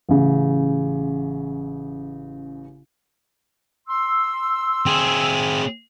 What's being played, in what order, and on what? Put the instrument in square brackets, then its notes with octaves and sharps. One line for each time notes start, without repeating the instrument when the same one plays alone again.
[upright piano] A1 C#3
[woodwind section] C6 E6
[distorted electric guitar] C4 G#4